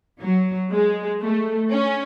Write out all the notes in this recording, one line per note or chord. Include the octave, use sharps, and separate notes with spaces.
F#3
G#3
A3
C#4